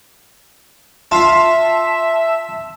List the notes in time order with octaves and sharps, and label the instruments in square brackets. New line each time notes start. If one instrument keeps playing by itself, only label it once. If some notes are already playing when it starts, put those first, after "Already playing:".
[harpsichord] F4 F5 [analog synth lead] E5 [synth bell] A5 E7